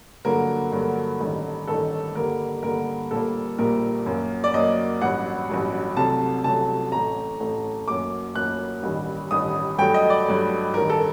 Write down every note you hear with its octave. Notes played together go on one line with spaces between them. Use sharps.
G2 D3 F#3 A#3 A#4
G2 D3 F#3 A#3
A1 G2 D#3 A3
A1 G2 D#3 A3 A4
G2 D3 G3 A#3 A#4
G2 D3 G3 A#3 A#4
A#1 A#2 G3 A#3 A4
A#1 A#2 G3 A#3 A#4
F#2 F#3 A#3
D5
F#2 F#3 A#3 D#5
A1 G2 F#3 F#5
A1 G2 F#3
C2 C3 F#3 A3 A5
C2 C3 F#3 A3 A5
A1 A2 A3 A#5
A1 A2 A3
F#2 F#3 A#3 D6
F#2 F#3 A#3 F#6
A1 G2 D#3 G3
A1 G2 D#3 G3 D#6
G2 F#3 A3 G5
D#5
D5
G2 F#3 A3
A1 G2 D#3 A#4
A4